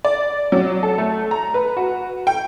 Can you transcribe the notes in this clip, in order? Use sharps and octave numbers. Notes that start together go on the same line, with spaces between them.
D5
F#3
A4
A3
A#5
B4
F#4
G5